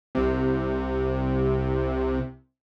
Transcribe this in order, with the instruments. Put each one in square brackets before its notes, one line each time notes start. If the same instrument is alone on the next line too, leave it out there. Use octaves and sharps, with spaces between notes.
[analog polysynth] C2 C3